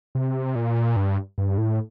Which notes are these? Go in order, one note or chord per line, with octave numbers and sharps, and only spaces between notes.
C3
A#2
G2
G2
A2